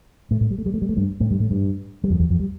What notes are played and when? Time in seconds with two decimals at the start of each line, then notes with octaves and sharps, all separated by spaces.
0.31 A2 A3
0.41 A2 A3
0.51 G3
0.58 A3
0.66 G3
0.74 A3
0.82 G3
0.89 A3
0.97 G2 G3
1.20 A2 A3
1.31 G2 G3
1.40 A2 A3
1.50 G2 G3
2.04 G3
2.10 F2 F3
2.19 E2 E3
2.30 F2 F3
2.40 G3